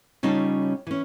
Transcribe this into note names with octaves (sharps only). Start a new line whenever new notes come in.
C#3 G3 C#4 D#4 F4 A5
E3 C#4